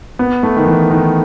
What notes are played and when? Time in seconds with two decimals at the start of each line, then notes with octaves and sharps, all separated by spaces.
0.19 B3
0.43 A3
0.56 D#3
0.66 E3
0.90 D#3